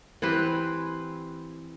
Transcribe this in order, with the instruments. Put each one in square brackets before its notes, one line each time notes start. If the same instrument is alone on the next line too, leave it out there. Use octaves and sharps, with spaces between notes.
[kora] E3 C4 G4 B4